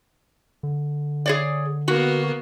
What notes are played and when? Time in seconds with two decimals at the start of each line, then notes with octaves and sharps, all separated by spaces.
0.63 D3
1.26 G#4 C#5 D5
1.88 A#3 B3 F#4